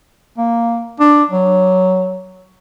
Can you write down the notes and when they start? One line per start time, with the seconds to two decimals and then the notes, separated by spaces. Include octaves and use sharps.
0.38 A#3
1.00 D4
1.30 F#3